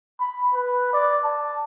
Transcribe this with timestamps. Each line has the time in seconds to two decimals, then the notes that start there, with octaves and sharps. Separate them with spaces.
0.20 B5
0.54 B4
0.93 D5
1.24 A5